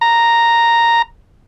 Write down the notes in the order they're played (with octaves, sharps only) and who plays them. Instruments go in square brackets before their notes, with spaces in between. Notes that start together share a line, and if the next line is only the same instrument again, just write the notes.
[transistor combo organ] A#5